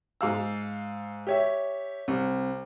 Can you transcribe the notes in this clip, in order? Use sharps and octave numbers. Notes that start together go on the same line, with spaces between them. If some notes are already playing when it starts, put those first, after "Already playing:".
G#2 F5 E6
G4 C#5 E5
C2